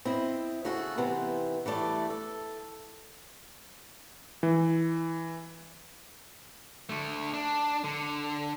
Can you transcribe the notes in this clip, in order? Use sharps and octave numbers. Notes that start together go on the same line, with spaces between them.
C4 E4 D#5
C#3 A3 F#4 G#4 A4
C3 D#3 E3 B3 C4
E3 G3 A3 D5
A4
E3
D3 A3
D4
D3